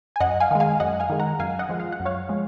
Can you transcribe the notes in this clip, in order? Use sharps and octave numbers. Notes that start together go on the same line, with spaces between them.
G#5
F#2 D#5 F#5
F5 G#5
D#3 G#3
F5 G#5
F#2 D#5 F#5
F5 G#5
D#3 G#3
F#5 A#5
F#2 F5 G#5
D#5 F#5
F3 G#3
F5
F#5
F#2
C#5 F5
F3 G#3